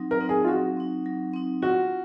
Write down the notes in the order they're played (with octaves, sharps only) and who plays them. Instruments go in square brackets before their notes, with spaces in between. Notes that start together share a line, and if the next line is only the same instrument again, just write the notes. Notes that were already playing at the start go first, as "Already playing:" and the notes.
Already playing: [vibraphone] F#3 C4 D#4
[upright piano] A#4
[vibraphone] C4 D#4
[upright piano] G#4
F4
[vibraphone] F#3 [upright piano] F#4
[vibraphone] C4 D#4
F#3
C4 D#4
[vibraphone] F4 [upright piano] F#4